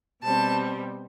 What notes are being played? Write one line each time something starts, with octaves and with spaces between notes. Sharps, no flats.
B2 G3 C4 A5